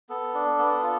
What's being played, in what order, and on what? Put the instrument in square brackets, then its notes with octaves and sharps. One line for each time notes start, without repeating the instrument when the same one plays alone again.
[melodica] B3 A4
D4
B3
F4